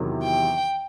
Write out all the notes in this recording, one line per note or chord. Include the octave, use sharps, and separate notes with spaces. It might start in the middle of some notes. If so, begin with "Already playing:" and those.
Already playing: E2 C3 D#3 F#3
G5